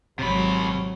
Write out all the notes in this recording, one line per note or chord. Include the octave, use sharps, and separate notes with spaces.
G#1 C3 F#3 B5